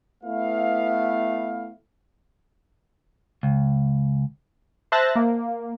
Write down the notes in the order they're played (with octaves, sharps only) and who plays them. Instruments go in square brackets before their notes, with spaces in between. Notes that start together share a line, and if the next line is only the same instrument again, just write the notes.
[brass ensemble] A3 B3 E4 F5
[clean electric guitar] C#2
[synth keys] C5 E5 A5 F#6 A6 A#6
A#3